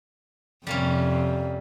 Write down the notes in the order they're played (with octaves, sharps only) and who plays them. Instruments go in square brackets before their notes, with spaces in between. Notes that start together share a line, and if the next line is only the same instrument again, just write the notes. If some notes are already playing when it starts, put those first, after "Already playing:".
[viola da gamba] F2 C3 [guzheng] G3 A#3 C#4